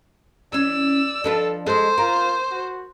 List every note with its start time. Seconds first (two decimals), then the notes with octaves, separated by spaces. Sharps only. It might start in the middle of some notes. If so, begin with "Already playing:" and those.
0.53 E3 C#4 D5 E6
1.24 F3 D4 A4 B4
1.66 G#3 G#4 A4 C5
1.98 F4 A#4
2.51 F#4